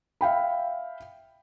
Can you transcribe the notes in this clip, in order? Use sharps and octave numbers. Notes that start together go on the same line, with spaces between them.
E5 F5 G5 B5